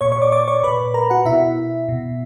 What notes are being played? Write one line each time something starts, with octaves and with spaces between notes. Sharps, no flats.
A#2 C#5 C#6
C#5 C#6
D5 D6
D5 D6
C#5 C#6
A#2 B4 B5
A#4 A#5
F#4 F#5
B2 E4 E5
B2